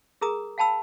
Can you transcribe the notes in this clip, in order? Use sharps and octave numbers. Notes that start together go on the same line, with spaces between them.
G#4 A#4 A#5 D#6
F5 G5 A5 B5 E6